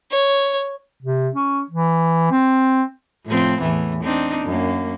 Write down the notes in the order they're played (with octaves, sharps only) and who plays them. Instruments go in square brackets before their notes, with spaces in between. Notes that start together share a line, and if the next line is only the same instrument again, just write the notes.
[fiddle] C#5
[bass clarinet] C3
C#4
E3
C4
[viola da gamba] A2 F3 C4
E2 A2 E3
C4 D4 D#4
F#2 A#3